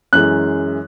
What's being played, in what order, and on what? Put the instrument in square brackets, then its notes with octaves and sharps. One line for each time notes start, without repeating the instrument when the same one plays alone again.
[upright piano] F#2 E3 G#3 F#6